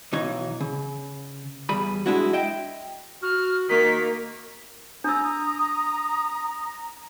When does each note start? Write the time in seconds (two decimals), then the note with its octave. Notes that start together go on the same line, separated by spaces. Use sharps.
0.12 B1 E3 D#4 C#5
0.60 C#3
1.69 E2 G3 G#4 B5
2.06 F#3 G#3 D4 E4 F#4
2.33 D#5 E5 G5
3.23 F#4 F6
3.69 D#3 A#3 F#4 B6
5.04 D4 A#5 D#6 E6